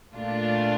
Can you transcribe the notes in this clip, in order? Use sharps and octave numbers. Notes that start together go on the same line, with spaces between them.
A#2 A3 D4 F4